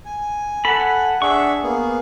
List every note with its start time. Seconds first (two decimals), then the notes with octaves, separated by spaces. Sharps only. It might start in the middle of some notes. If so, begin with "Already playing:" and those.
0.05 G#5
0.65 A4 F#5 B5
1.22 D4 G#4 E5 C#6
1.63 A#3 B3 G#4